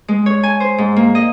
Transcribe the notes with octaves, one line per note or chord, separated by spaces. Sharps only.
G#3
C#5
G#5
C5
G#2
A#3
D#5